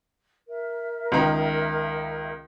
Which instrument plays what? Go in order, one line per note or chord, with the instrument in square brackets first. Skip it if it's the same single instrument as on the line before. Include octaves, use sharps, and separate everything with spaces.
[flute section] A#4 E5
[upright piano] C#2 D#3 A#5